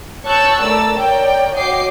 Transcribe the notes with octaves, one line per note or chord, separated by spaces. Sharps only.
C#5 A5 C#6 E6 F#6 G6
A3 A#4 D5 E6 A6
A#4 C#5 D5 G5
F#4 C#5 D#5 G5 D6 C7